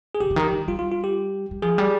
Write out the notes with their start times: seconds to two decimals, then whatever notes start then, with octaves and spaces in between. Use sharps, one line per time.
0.15 G#4
0.20 C#3 G4
0.30 C#3
0.36 D#3
0.44 G4
0.52 G3
0.68 G3 F4
0.79 F4
0.91 F4
1.04 G4
1.51 G3
1.62 F3 G#4
1.78 G3